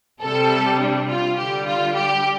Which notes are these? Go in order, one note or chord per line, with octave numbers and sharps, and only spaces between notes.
C3 A4
G3
D4
F4
D3 G3 G4
F4
G4